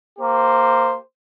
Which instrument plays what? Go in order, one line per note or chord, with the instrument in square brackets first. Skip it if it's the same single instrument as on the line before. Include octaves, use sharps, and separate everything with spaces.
[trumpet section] A#3 G4 C5